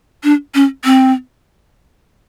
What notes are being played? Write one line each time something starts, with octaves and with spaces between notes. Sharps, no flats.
D4
C#4
C4